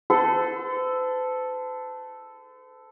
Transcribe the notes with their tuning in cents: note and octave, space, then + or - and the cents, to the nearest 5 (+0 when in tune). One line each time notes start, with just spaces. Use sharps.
A4 +0 C5 -45